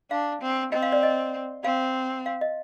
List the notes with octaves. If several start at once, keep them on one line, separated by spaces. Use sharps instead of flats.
D4 F5
C4
C4 D#5
F5
D5
D#5
C4 F5
F5
D#5